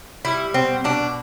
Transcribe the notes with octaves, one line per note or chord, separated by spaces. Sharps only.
G3 E4
B2 C4
B2 D4